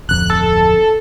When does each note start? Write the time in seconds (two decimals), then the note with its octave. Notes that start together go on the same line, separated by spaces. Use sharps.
0.09 D1 F2 F#6
0.30 A4